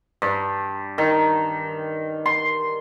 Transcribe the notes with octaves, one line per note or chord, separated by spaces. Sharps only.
G2
D#3
C6